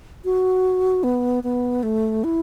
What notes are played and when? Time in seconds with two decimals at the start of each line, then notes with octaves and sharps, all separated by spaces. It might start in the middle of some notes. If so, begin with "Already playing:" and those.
0.25 F#4
1.04 B3
1.44 B3
1.83 A3
2.24 E4